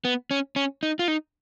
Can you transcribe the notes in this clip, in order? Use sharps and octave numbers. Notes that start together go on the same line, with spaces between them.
B3
C#4
C#4
D#4
F4
D#4